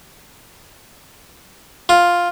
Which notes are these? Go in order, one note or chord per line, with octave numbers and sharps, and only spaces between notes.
F4